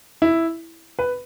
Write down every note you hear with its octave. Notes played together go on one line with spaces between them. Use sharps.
E4
B4